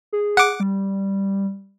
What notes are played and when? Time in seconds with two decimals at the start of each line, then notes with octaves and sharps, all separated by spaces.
0.13 G#4
0.37 F#5 D6
0.60 G3